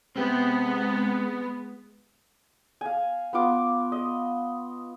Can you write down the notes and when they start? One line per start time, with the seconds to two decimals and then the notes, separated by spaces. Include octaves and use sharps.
0.16 G#3 B3 C4 G4
2.81 F5 G#5
3.33 B3 F4 D6
3.92 D#5